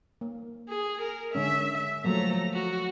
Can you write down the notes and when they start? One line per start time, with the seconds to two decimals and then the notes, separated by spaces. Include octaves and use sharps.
0.21 A#3
0.70 G#4
1.02 A#4
1.35 D3 G#3 C#4 E5
2.04 F3 F#3 A3 A#3 A#5
2.53 F#4